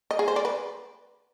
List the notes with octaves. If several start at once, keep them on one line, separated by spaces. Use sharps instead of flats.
D#5
G#4
C5
D5
B4